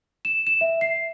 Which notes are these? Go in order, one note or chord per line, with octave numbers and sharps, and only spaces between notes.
E7
E7
E5
C7